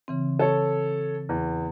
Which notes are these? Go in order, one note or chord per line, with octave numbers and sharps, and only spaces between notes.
C#3 E3 C4
A4 C#5
E2